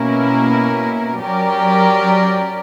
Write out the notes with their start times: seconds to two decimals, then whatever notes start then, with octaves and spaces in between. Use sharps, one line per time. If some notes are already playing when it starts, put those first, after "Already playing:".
Already playing: B2 A#3 C#4 E4 A#4
1.20 F#3 C#4 G4 A#4 D5